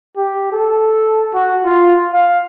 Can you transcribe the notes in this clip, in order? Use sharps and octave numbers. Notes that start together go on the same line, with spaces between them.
G4
A4
F#4
F4
F5